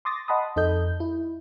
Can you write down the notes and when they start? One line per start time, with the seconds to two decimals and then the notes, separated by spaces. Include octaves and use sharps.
0.05 C6 D6 D#6 A6 A#6
0.28 D#5 F#5 A5 B5 C6 D#6
0.56 F2 D#4 A4 D#5 G6
1.00 E4